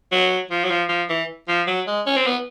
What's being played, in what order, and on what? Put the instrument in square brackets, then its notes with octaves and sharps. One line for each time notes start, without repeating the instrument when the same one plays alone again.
[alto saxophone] F#3
F3
F#3
F3
F3
E3
F3
F#3
G#3
C#4
C4
B3